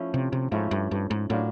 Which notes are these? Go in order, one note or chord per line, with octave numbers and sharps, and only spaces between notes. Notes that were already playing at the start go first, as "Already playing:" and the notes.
Already playing: F3 A3 C#4 E4
C3
C3
G#2 F3 A3 C#4 E4
G2
G2
G#2
A2 F#3 A#3 D4 F4